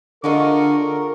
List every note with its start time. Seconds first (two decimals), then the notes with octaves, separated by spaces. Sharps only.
0.24 D3 G#3 F4 A#4 D#5 C#6